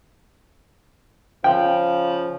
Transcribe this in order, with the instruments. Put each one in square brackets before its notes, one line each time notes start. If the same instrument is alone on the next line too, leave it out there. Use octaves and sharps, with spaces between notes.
[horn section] C#3 F3 [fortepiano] G5